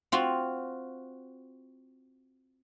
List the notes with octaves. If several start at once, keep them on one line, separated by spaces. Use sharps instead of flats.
C4 F4 F#4